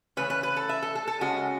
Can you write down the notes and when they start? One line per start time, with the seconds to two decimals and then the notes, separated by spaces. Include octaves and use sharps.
0.17 C#3 E3 A3 C#4 B4
0.30 B4
0.43 B4
0.56 A4
0.69 E5
0.83 A4
0.95 A4
1.08 A4
1.21 C#3 G#3 C#4 F#4